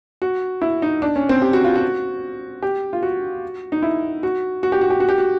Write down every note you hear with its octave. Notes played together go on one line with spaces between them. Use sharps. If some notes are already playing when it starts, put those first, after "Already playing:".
F#4
E4
D#4
D4
C#4
C4
G4
F#4
F4
F#4
G4
F4
F#4
D#4
E4
F#4
F#4
G4
F#4
G4
F#4
G4
F#4